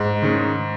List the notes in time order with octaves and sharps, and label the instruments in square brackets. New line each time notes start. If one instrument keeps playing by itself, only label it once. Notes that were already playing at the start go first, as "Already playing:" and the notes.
Already playing: [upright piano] G#2
[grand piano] D#3 G#3 C#4